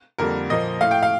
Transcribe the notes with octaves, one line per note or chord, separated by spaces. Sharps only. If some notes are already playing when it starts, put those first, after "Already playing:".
F2 D3 G3 A#3 A#4
A#2 F3 A#3 D#5
A2 A3 F5
G5
F5